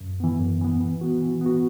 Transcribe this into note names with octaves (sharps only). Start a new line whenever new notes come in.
F#2
E3 B3
F#2
E3 B3
E3
B3 F#4
E3
B3 F#4